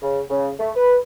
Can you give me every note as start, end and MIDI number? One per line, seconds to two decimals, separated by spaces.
0.02 0.21 49
0.30 0.50 49
0.59 0.70 57
0.75 0.97 71